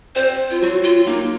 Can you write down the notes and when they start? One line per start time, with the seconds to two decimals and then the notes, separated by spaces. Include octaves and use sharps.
0.15 C4 C5
0.51 F4
0.61 F#3 F#4
0.84 F4
1.07 A#3 D#4